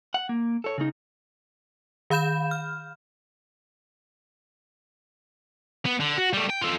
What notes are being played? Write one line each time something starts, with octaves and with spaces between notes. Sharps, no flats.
F#5
A#3
A4 C#5
C#3 D#4
D#3 F5 B5 G6 E7
F6
B3
D3
F#4
G3 A3
G5
F4 A4